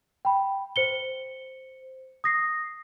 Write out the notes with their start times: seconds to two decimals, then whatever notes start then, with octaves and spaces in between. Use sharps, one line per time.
0.25 G5 B5
0.76 C5 C#7 G7
2.24 D#6 A#6 C7